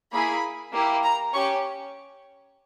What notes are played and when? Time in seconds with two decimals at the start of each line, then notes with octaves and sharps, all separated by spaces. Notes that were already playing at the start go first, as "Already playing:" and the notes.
0.11 A#3 E4 G#4 B5
0.73 A#3 E4 G4
1.03 A#5
1.33 C#4 G4 C#6